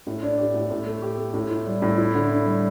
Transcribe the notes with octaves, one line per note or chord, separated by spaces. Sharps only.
A2
D4
G4
A2
A2
A3
G4
A3
A2
E4
G3
A2
E4
D3
D3
G3